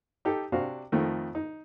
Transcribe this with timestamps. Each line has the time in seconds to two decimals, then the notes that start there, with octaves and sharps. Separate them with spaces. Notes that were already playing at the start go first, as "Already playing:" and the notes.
0.25 D#4 G4 A4
0.52 C3 D4 F#4 F5
0.92 F2 D#3 A3
1.35 D#4